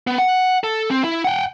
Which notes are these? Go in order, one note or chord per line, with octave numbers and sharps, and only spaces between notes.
B3
F#5
A4
C4
E4
F#5 G5